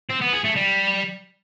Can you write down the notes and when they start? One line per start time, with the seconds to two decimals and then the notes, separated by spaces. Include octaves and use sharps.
0.10 C4
0.21 B3
0.33 G#4
0.44 A3
0.56 G3